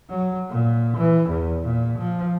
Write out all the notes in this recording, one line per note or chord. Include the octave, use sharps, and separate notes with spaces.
F#3
A#2
E3
E2
A#2
F3